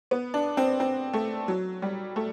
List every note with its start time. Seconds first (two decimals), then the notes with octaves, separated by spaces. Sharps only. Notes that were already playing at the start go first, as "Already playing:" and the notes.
0.11 B3
0.34 D4
0.57 C4
0.80 C4
1.13 A3
1.48 F#3
1.82 G3
2.16 A3